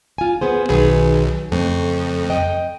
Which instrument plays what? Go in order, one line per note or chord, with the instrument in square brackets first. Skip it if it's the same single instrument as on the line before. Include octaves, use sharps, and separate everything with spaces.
[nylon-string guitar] F4 G#5
B3 G#4 C5
[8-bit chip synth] B1 [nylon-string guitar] D#3 G#4 B4
[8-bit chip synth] F2 [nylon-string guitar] C#3 A3
[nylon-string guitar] D#5 G5